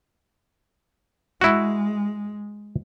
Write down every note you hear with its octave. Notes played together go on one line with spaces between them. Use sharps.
G#3 E4 F#4